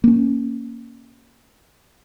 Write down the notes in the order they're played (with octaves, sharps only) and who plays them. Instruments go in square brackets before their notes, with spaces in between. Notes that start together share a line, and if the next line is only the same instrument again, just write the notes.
[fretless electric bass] A#3 C#4